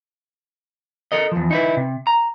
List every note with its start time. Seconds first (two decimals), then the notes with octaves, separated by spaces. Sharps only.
1.12 A4 A#4 D#5
1.32 E2 F3
1.51 D#4 E4 B4
1.77 C3
2.07 A#5